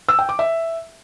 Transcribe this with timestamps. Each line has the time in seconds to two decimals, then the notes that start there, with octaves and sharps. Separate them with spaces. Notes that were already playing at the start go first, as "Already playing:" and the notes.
0.09 E6
0.19 G5
0.29 D6
0.39 E5